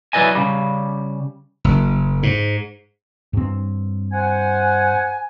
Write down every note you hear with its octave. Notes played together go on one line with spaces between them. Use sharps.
F#3 E4 B4 D5 D#5 G#5
C#3 G3
F#1
G#2
G2 C4
C5 F#5 G#5